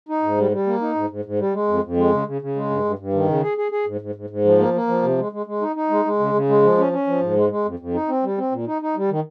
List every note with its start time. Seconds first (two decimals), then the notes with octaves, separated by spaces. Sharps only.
0.09 D#4
0.23 G#2
0.38 G3
0.51 G3
0.67 A#3
0.81 D#4
0.95 G#2
1.10 G#2
1.25 G#2
1.39 G3
1.54 G#3
1.68 F2
1.83 F2
1.97 G#3
2.12 C#3
2.27 C#3
2.42 C#3
2.56 G#3
2.70 G2
2.84 G2
2.99 G2
3.13 D#3
3.28 C#3
3.43 G#4
3.57 G#4
3.71 G#4
3.86 G#2
4.01 G#2
4.15 G#2
4.30 G#2
4.45 F3
4.59 A#3
4.73 A#3
4.88 F3
5.02 C3
5.18 G#3
5.32 G#3
5.46 G#3
5.61 D#4
5.76 D#4
5.90 G#3
6.05 G#3
6.19 C#3
6.34 C#3
6.49 G#3
6.62 F3
6.78 C#4
6.93 C#4
7.07 F3
7.21 G#2
7.36 G#3
7.50 G#3
7.65 F2
7.79 F2
7.94 D#4
8.09 C4
8.23 G3
8.38 C4
8.51 A#2
8.67 D#4
8.82 D#4
8.96 G3
9.10 D#3